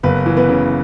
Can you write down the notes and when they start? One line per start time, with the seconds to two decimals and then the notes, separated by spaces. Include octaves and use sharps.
0.03 F#1 B3 B4
0.26 E3
0.37 B3 B4
0.49 C#3